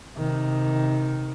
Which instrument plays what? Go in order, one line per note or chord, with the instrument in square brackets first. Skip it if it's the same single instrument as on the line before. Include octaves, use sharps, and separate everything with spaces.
[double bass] C3 D#3